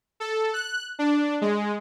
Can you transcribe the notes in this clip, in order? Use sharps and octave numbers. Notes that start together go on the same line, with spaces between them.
A4
F#6
D4
G#3